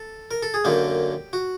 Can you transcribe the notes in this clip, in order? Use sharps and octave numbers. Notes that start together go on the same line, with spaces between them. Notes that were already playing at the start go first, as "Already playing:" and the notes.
Already playing: A4
A#4
A4
G#4
F#2 D3 F#3 A#3 G4
F#4